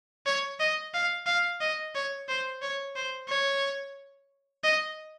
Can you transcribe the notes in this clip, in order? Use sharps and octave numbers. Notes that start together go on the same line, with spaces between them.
C#5
D#5
F5
F5
D#5
C#5
C5
C#5
C5
C#5
D#5